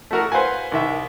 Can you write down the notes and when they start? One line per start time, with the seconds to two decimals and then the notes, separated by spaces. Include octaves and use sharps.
0.11 A3 E4 F#4 A#4
0.32 B4 C5 F5 F#5 G#5
0.72 C2 D#3 E5